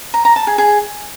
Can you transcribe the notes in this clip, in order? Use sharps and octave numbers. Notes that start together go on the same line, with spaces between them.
A#5
A#5
A5
G#4
G#4